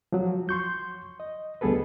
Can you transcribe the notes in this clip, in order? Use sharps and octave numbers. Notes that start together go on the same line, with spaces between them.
F3 F#3
C6 C#6 G6
D#5
D2 G3 B3 G#4 A4 B4